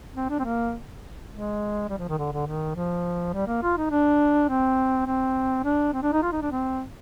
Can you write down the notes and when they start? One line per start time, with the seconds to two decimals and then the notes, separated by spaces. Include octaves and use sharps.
0.16 C4
0.29 D4
0.39 C4
0.44 A#3
1.32 G#3
1.89 G3
1.98 F3
2.09 D#3
2.18 D3
2.32 D3
2.46 D#3
2.75 F3
3.34 G3
3.47 A#3
3.63 F4
3.77 D#4
3.91 D4
4.49 C4
5.07 C4
5.64 D4
5.93 C4
6.03 D4
6.12 D#4
6.22 F4
6.32 D#4
6.42 D4
6.51 C4